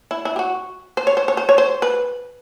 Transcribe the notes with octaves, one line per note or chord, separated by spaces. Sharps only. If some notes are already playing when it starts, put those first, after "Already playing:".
E4
E4
G4
F#4
C5
C#5
C5
C#5
C5
C#5
C5
B4